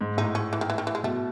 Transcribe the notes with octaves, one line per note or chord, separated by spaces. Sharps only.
G#2
A2 D#4
C#4
E3
D#3
E3
D#3
E3
G#3
B2 A3